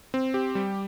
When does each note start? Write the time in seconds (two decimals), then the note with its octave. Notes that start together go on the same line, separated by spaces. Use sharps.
0.14 C4
0.34 G4
0.55 G3